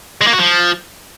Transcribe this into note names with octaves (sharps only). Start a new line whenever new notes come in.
G#3
A#3
F#4
F3